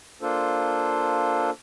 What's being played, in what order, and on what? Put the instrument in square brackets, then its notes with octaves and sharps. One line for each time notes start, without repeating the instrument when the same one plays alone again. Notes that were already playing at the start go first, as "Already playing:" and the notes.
[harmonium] A#3 D4 F4 A4 C5